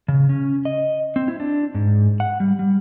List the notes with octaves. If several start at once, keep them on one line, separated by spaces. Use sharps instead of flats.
C#3
C#4
D#5
C4
E4
D4
G#2
F#5
G3
G3